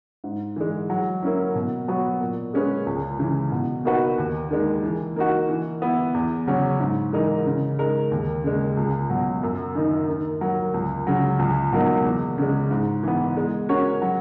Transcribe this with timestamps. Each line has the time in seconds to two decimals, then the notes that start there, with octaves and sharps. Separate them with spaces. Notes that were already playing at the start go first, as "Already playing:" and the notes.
0.24 G#2
0.56 E3 G#3
0.90 F#3
1.23 A#3 C#4 E4
1.55 B2
1.88 F#3 B3 F#4 C#5
2.21 A#2
2.53 G#3 C#4 G#4 B4
2.87 C#2
3.19 C#3 E3
3.52 B2
3.85 A#3 D#4 F#4 B4
4.18 D#2
4.51 D#3 G#3
4.83 E3
5.16 A#3 D#4 F#4
5.49 E3
5.82 B3 E4
6.14 E2
6.47 C#3 F#3 C#4
6.80 G#2
7.13 E3 G#3 D#4 A#4
7.46 C#3
7.79 G#3 D#4 A#4
8.12 D#2
8.44 C#3 G#3
8.77 C#2
9.10 B2 F#3
9.43 F#2
9.75 D#3 A#3 D#4
10.08 D#3
10.41 F#3 A#3
10.74 C#2
11.07 C#3 F#3
11.39 C#2
11.72 B2 F#3 A#3 D#4
12.05 E2
12.38 C#3 G#3
12.71 G#2
13.03 E3 B3
13.37 G#3
13.69 C#4 F#4 A#4 C#5
14.02 F#3